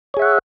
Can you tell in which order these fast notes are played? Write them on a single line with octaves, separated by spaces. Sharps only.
C#5 G#4 E5 F#5